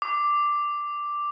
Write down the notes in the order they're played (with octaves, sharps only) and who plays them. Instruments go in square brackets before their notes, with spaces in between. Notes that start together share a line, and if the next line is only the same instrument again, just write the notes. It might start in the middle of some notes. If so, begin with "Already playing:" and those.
[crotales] D6